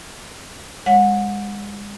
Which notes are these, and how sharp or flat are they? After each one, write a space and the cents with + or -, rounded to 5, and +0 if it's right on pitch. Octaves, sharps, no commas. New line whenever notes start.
G#3 -30 C#5 +5 F#5 -30